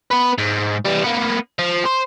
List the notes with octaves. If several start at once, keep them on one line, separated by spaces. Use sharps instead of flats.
B3 B4
G#2
E3 G3
A#3 B3
F3
C5